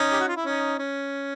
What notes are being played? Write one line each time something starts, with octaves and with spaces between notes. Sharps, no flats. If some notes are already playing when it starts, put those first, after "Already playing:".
Already playing: C#4 D#4
G4
F#4
F4
E4
C#4 D#4
C#4